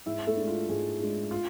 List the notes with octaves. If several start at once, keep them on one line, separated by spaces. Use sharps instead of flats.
G#2 E4 E5
A3 A4
G#3 D4
F4
G#2 G#4
G#3 D4
F4